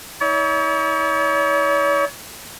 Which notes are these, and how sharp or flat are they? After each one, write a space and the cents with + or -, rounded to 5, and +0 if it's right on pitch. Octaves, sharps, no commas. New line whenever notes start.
E4 -45 C#5 +40